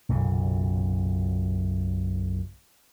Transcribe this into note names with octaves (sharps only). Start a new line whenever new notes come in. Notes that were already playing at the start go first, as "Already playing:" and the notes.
B1 F#2 A#2 C#3